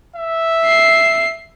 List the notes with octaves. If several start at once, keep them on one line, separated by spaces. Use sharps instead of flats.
E5
C7